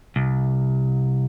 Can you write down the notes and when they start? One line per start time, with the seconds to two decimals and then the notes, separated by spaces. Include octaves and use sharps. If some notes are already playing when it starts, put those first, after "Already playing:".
0.16 C2